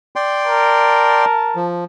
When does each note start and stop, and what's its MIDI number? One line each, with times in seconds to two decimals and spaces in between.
0.16 1.25 74
0.16 1.25 79
0.16 1.25 84
0.47 1.61 70
0.47 1.84 81
1.56 1.84 53